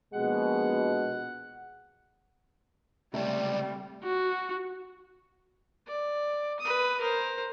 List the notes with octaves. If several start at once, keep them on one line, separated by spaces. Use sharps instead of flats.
A#1 B2 G#3 F#5
C#2 C3 G3 A3 D5
F#4
D5
B4 D#6
A#4 C5